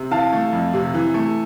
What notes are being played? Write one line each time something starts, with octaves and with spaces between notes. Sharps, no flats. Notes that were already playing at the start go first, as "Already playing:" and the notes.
Already playing: C3
E3 F5 A5
A3
F2
C3
E3
A3